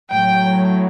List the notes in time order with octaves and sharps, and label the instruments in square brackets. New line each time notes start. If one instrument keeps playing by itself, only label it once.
[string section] A2 F#3 G5